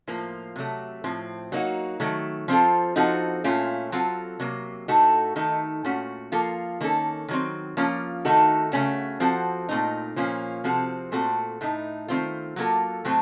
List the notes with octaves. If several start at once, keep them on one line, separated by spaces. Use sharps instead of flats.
A2 F3 A#3 F4
C3 F#3 A3
A2 F3 C4
F#3 A#3 D#4 F#4
D#3 F#3 A3
F3 C4 F4 A4
F3 C4 D#4 F#4 A4
A#2 A3 C#4 F4
F#3 C4 F4 A4
C3 F#3 A#3
A2 A3 D#4 F#4 A4
D#3 A3 D#4 A4
A#2 A3 C#4 F#4
F3 A#3 F4 A4
D#3 A#3 C#4 A4
D#3 F#3 C4
F3 A#3 C#4 F4
D#3 A3 D#4 F#4 A4
C#3 A3 C#4 F#4
F3 C4 F#4 A4
A#2 A3 C4 D#4
A#2 F3 A#3 C#4 F4
C3 F3 C4 F#4 A4
A#2 A3 C4 F#4 A4
A2 A3 D#4
D#3 A3 C4 F4
F#3 A#3 F4 A4
A2 F#3 A3 C4